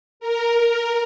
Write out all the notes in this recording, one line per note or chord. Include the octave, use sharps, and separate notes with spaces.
A#4